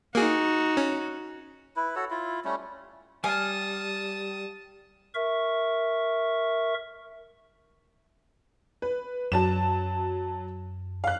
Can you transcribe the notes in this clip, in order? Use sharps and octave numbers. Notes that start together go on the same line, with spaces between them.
A#3 D#4 F#4 G#4
C#4
E4 B4
F#4 A4 C#5
E4 F4
G3 A3 C#4
G3 F5 G#5 A5 D#6
A#4 E5 C#6
B4
F#2 F#3 A5 E7
F5 F#6